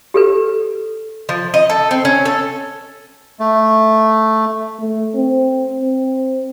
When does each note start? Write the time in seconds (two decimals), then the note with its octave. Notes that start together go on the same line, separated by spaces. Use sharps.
0.14 G4 A4 B4
1.29 F3
1.54 D#5
1.70 A4
1.91 C4
2.05 C#4
2.25 A4
3.40 A3
4.80 A3
5.15 C4
5.80 C4